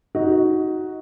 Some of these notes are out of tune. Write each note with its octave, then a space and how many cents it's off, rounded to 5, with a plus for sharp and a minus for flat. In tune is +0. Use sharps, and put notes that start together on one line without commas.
D#4 +15 F#4 +0